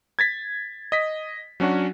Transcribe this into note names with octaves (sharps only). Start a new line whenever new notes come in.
G#6 A6 B6
D#5 B6
F#3 C#4 D4 F#4